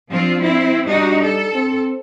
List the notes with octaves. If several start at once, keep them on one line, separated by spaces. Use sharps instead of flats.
F3 C4 D4 F4
C4 E4
G3 D4 D#4 F#4
A4
C4